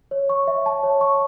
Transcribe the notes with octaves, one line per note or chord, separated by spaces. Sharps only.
C#5
C#6
E5
A5
C#5
C#6